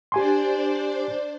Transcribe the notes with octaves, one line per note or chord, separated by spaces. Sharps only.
D4 G4 C5 D5 G#5 C6